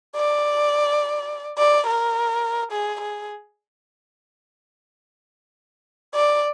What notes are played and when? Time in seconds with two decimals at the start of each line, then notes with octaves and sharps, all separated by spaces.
0.16 D5
1.58 D5
1.87 A#4
2.72 G#4
3.01 G#4
6.14 D5